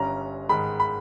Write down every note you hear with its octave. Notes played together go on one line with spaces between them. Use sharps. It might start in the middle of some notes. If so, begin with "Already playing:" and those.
Already playing: G1 G2 G3 C#4 A#5
G#2 D#3 G#3 B5
B5